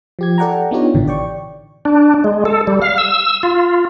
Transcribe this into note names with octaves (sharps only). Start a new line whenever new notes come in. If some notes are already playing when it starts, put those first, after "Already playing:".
F3 G4 G#6
A4 D5 F#5 G5 A#5
B3 D4 D#4 F4 G4 C#5
A1 B2 D3 E3
D5 G5 C#6
D4
G#3
A4
G3
F5
E6
F4